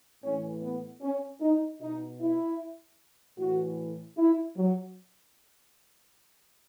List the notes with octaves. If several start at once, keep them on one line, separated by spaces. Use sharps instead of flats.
A2 E3 C#4
B3
C#4
D#4
B2 D#4
E4
A2 E3 F#4
E4
F#3